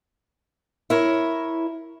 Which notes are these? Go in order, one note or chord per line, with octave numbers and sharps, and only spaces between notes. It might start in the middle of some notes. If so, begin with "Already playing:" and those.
E4 A#4 C#5